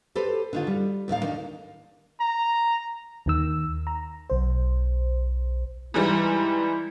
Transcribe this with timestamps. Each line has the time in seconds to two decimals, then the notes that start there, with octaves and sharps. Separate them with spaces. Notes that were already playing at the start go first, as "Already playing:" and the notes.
0.15 G4 A4 B4 C5
0.53 D3 D#3 F4
0.67 G3
1.08 D#2 A2 D#3 F5
1.22 D#3 D4 D#4
2.20 A#5
3.26 D#2 D#3 E6
3.87 A#5
4.30 B1 C5
5.94 G#2 E3 G3 E4